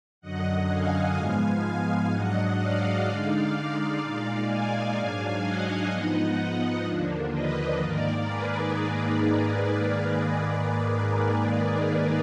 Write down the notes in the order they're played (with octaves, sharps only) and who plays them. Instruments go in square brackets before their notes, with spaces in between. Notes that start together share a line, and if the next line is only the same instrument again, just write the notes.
[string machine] F#2 D3 F#3 D#5 F#5
F5 G#5
G#2 F3 G#3 B3 F5 G#5
F5 G#5
G#2 F#3 D4 D#5 F#5
D5 F5
D3 G#3 D#4
A#2 G#3 D#4 D5 F5
F5 G#5
G#2 F#3 D4
D#5 F#5
G#2 F3 B3 D#4
D#2 D3 F3 A#3 D4
B4 D#5
G#2 D#3 A#3 A#4 D5
G#4 B4